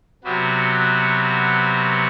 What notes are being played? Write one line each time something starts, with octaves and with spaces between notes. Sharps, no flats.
C3 F#3 B3 F#4